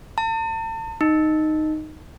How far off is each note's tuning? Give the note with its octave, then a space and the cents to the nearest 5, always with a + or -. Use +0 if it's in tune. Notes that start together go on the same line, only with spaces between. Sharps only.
A5 +40
D#4 -5